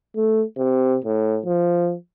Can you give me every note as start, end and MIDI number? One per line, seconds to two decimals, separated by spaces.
0.17 0.43 57
0.58 0.97 48
1.05 1.40 45
1.46 1.94 53